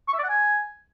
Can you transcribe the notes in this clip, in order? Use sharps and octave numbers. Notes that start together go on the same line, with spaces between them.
C#6
E5
D5
F#5
G#5